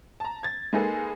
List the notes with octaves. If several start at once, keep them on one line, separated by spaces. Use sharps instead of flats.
A5 A#5
G#6 A6
G#3 A#3 D#4 G#4 A4 B4